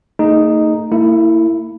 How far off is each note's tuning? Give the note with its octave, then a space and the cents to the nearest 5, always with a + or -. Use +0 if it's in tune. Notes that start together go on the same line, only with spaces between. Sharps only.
A3 +45 D#4 +0 G#4 +0
A#3 -45 E4 +0